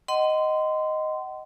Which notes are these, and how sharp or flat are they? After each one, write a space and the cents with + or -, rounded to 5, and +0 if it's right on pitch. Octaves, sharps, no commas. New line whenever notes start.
D#5 +0 F#5 +35 C6 -20